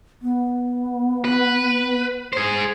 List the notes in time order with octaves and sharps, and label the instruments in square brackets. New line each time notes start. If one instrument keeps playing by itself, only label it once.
[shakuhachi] B3
[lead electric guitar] B4
G#4 C5